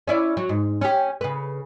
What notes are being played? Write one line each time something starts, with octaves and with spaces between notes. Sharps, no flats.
C#4 E4 D5
F#3
G#2
C#4 G4
C#3 B4